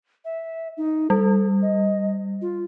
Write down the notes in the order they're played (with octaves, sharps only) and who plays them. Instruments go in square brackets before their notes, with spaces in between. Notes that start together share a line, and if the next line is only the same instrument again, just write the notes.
[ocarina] E5
D#4
[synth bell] G3 [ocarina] A4
[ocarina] D#5
F4